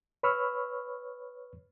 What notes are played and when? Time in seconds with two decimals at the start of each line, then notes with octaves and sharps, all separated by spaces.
0.23 B4 C#5 B5 C#6 E6 F6